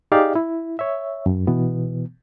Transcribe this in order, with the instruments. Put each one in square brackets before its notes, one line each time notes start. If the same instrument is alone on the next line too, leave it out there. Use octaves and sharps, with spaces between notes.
[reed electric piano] D#4 G4 G#4 D5 D#5 F5
E4
C#5 E5
F#2
B2 E3 B3